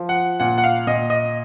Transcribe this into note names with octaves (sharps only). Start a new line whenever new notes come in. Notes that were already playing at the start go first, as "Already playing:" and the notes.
Already playing: F3
F#5
A#2 F#5
F#5
F5
A#2 D#5
D#5